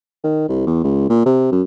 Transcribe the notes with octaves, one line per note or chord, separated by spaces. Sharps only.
D#3
C2
E2
C#2
A#2
C3
F#2